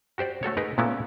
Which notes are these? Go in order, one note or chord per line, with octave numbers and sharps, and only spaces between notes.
F#4 G4 C5 D5
A3 F#4 A4 C#5
D#4 G#4 A#4 B4
A#2 A3 B3 C#4 E4